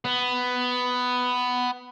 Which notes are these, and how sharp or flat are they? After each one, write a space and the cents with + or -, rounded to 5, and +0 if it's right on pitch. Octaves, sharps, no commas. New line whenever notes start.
B3 +10